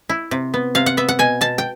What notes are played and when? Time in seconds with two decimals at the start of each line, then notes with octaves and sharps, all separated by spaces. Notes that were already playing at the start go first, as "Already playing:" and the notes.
0.09 E4
0.31 C3
0.54 B3
0.75 C3 F5
0.86 F#5
0.97 B3 E5
1.09 F#5
1.19 B2 G#5
1.41 B2 A5
1.58 G5